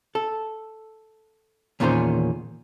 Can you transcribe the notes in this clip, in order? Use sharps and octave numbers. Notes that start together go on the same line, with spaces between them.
A4
E2 A#2 D#3 C#4 G#4 C5